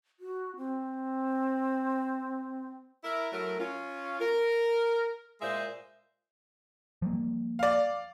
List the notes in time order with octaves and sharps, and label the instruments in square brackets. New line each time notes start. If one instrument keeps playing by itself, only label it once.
[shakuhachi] F#4
C4
[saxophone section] E4 A#4
F#3 A3 E4 A#4
C#4 F4
A#4
A#2 G#3 A#3 G#4 C5 E5
[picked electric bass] F3 G3 A#3
[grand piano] D5 F5